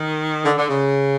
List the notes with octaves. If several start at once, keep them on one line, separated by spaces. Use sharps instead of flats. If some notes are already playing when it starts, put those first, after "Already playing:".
Already playing: D#3
D3
D3
C#3